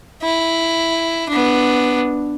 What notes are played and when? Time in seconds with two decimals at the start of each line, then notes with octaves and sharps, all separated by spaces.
0.23 E4
1.29 B3 D4